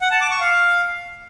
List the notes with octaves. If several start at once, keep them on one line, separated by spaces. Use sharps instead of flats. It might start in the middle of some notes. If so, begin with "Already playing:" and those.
F#5
A5
D6
C#6
F5